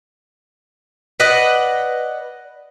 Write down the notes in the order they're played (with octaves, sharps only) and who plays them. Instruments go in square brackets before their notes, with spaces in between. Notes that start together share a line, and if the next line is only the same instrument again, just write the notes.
[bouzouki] B4 D5 D#5 F#5